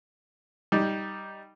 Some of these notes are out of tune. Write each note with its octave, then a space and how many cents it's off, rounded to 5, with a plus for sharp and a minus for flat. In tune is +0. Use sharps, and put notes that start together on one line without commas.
G3 +0 D#4 +5